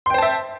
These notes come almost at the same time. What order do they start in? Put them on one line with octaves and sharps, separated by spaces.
C6 G5 C5 A5 E5